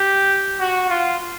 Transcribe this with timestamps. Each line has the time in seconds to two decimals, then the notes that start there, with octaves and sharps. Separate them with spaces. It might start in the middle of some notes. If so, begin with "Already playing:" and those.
Already playing: G4
0.60 F#4
0.90 F4